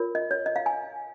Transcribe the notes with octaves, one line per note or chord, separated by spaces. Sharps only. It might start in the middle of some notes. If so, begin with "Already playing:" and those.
Already playing: F4 A#4 C#5
D#5
C#5
D#5
F5
G#5